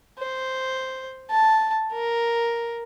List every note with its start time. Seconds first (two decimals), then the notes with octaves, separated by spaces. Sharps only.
0.19 C5
1.31 A5
1.92 A#4